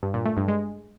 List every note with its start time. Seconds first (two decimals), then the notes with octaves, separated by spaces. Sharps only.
0.03 G2
0.14 A#2
0.25 A3
0.37 G2
0.48 G#3